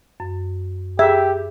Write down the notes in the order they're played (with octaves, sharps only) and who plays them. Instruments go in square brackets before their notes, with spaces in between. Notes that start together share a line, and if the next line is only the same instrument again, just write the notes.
[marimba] F#2
[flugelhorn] G4 [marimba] G#4 [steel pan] E5